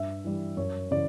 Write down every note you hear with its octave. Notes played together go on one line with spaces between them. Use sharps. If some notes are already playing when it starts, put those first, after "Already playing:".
Already playing: G2 E5
E3 G3
F#2 C#5
C#3 E3 D5